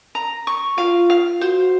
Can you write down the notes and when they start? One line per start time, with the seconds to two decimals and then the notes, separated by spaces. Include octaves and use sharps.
0.15 A#5
0.47 C#6
0.78 F4 F5
1.10 F5
1.41 F#4 C5